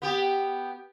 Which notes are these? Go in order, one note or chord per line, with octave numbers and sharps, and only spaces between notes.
B3 G4